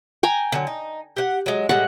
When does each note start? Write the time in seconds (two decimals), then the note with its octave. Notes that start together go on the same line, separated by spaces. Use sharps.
0.23 G5 G#5 A#5
0.52 D3 F#3
0.67 D#4
1.16 G4 F#5
1.46 F#3 G#3
1.69 A2 G3 G#3 F#5